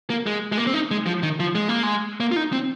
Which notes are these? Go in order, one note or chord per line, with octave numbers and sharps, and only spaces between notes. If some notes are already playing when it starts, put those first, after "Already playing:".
A#3
G#3
G#3
A#3
C4
D#4
G#3
F3
D#3
F3
G#3
A#3
G#3
A#3
F4
D#4
C4